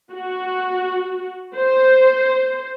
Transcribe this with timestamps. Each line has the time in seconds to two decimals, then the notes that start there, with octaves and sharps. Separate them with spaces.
0.12 F#4
1.55 C5